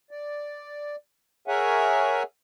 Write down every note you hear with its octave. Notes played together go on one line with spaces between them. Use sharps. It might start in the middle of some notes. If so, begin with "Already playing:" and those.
D5
G#4 A#4 C#5 E5 F#5 G#5